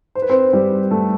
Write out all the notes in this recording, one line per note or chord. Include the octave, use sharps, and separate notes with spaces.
C5
B4
C4 C5
G3 G4
A3 A4